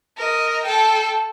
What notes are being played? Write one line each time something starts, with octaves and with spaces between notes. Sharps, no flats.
A#4 D#5
A4 G5